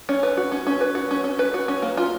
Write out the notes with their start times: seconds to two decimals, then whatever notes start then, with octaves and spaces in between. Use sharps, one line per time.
0.09 C#4
0.23 B4
0.37 F#4
0.52 C#4
0.67 C#4
0.81 B4
0.95 F#4
1.11 C#4
1.24 C#4
1.39 B4
1.54 F#4
1.68 C#4
1.82 A#3
1.97 F4